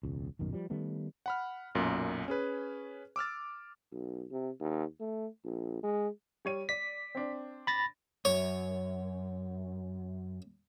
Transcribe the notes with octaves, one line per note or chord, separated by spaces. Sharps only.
E1 C#2
D#1 B1 F#2 D#3
F3 G3
D#3 G3 A3 B3
F#5 B5 F6
B1 F#2 A#2
C#4 G#4 B4
D6 E6 F6 A6
B1
C3
D#2
A3
A#1
G#3
G3 C#5 D#7
D5 B6
C4 D4
B5 A6 A#6
F#2 C#5